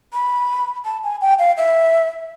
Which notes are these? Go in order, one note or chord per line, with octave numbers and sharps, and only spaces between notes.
B5
A5
G#5
G5
F5
E5